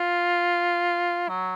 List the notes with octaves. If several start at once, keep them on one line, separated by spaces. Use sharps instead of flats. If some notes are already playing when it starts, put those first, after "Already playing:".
Already playing: F4
F#3